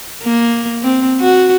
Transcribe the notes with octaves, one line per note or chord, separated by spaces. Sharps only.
A#3
C4
F#4